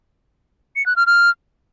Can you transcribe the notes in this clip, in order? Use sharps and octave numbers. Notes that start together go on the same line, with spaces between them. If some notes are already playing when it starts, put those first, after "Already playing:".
C#7
F#6
F6
F6